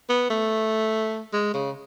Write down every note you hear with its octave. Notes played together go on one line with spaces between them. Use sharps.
B3
A3
G#3
C#3